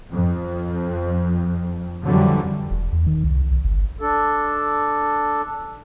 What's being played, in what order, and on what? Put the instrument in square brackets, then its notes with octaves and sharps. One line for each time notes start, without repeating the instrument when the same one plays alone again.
[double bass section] F2
F2 D3 E3 F#3 G3
[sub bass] E1
E2
D#3
C2
B1
G1
[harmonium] D4 A4